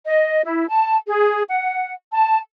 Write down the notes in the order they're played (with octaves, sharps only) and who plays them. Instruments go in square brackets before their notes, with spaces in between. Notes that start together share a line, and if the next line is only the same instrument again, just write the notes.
[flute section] D#5
E4
A5
G#4
F#5
A5